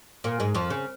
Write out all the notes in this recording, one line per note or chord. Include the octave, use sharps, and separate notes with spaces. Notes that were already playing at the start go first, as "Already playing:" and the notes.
A#2 A#3
G#2 G#3
F2 F3
C#3